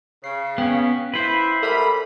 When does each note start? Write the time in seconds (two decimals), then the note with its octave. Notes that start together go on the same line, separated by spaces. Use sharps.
0.24 C#3 C7
0.58 B3 C#4 F5 G5
1.14 E4 B4 C5
1.63 G#2 G3 A4 A#4 E5 B5